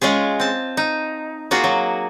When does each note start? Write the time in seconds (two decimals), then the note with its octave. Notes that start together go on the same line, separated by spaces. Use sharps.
0.01 G#3 C#4 F4 G#4
0.40 C4 A5
0.77 D#4
1.51 A#3 F4 F#4 G#4
1.64 F#3